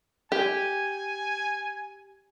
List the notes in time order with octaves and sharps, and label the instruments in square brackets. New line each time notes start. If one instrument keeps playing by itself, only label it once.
[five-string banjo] G4 [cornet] G#5